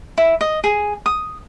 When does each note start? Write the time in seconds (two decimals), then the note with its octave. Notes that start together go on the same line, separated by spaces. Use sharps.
0.18 E4
0.41 D#5
0.64 G#4
1.06 D#6